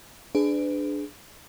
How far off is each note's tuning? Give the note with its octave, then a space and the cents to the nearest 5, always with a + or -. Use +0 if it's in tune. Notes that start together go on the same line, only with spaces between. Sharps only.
D4 +5 G#4 +5 B4 +35